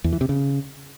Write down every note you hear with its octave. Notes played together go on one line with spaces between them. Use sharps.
E2
E3
C3
C#3